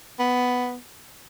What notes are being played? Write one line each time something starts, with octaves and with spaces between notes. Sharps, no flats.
B3